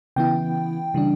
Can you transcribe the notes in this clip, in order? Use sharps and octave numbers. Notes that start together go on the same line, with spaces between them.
C#3 E3 B3 E4 G5
C#3 E3 G3 D4